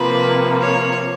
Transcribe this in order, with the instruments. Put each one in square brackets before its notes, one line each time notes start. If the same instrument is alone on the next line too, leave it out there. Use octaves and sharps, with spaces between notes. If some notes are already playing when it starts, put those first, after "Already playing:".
Already playing: [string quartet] C3 F3 A#3 [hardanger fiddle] B4
[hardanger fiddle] C#5